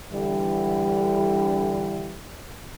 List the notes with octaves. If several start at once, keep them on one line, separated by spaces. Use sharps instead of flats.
D3 E3 G3